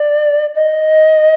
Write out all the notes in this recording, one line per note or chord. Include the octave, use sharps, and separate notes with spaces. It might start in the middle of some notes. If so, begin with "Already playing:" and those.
Already playing: D5
D#5